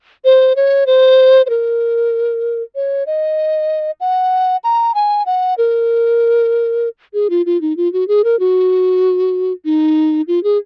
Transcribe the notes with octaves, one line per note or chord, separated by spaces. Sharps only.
C5
C#5
C5
C5
A#4
C#5
D#5
F#5
A#5
G#5
F#5
A#4
G#4
F4
F4
D#4
F4
F#4
G#4
A#4
F#4
D#4
F4
G#4